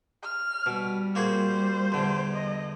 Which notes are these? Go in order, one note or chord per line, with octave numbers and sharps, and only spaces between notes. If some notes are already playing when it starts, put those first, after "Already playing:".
F6
B2 G3
A#3 F#4 G#4 C5
E2 D3
D#5